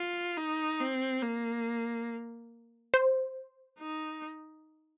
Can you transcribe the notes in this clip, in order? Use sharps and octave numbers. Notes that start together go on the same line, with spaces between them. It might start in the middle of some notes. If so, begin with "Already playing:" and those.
Already playing: F4
D#4
C4
A#3
C5
D#4